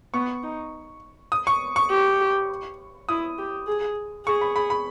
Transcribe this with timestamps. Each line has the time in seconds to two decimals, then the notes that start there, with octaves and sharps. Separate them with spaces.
0.14 B3 C#6
0.43 D#4
1.32 D#6
1.47 C#6
1.76 C#6
1.90 G4
3.09 E4 D#6
3.38 G4
3.67 G#4
4.26 G#4 C#6
4.41 B5
4.56 B5
4.70 B5